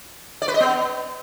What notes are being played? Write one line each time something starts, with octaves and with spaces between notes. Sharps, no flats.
D5
B4
D#5
B3